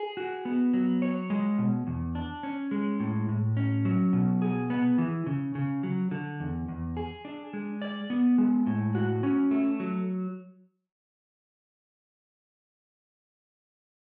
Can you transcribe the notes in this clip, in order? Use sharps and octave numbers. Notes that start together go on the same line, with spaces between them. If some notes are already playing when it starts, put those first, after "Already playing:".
Already playing: G#4
F#4
B3
F#3
C#5
G#3
B2
E2
D4
C#4
G#3
A2
A2
C#4
F#3
B2
G#4
B3
E3
C#3
C#3
F#3
D3
E2
E2
G#4
D4
G#3
D5
B3
G#3
A2
F#4
C#4
A3
F#3